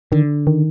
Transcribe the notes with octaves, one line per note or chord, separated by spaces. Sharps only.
D3 D#3
D#3